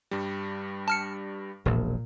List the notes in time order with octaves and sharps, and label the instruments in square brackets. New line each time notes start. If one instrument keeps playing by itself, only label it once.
[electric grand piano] G2 G3
[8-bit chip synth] A5 F6 C#7
[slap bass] E1 A#1 [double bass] A#2